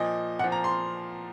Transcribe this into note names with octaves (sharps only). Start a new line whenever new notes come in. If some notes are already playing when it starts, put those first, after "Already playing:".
Already playing: A#2 F3 D#5
A#2 F3 F#5
A#5
C6